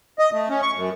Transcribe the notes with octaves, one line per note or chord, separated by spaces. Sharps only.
D#5
A3
C#4
C#6
F#2